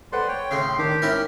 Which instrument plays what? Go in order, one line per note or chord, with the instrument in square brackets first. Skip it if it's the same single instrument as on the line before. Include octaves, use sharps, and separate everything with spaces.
[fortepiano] A4 B4 F#5 [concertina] C5 D5 C6
[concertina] C#5 G5
[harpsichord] A2 C#3 [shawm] C6
[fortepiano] D#3 [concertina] D4 D6 [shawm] G4
[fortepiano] G#2 [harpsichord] C#4 E4 A#4 [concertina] G5